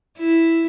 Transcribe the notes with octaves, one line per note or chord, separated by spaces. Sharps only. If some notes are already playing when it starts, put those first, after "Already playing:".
E4